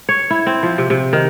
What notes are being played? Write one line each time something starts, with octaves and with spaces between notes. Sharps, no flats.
C#5
E4
C4
F3
C3
C3
D#3